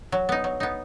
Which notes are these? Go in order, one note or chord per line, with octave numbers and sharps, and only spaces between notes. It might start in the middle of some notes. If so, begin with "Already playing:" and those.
F#3
B3 D#4
F#3
B3 D#4